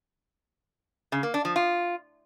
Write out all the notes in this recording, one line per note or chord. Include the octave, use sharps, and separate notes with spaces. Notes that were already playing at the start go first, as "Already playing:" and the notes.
C#3
A#3
D4
F3
F4